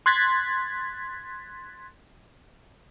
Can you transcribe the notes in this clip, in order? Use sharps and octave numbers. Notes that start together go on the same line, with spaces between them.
C6 F#6 G#6 A6 B6